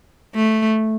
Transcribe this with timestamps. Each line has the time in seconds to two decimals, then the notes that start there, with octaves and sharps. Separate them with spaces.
0.35 A3